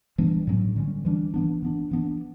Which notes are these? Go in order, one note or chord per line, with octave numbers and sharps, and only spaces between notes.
E3 G3 B3 D4
A2 F#3 C#4
D3 G3 C#4
E3 G3 D4
E3 B3 D4
E3 B3 D4
E3 B3 D4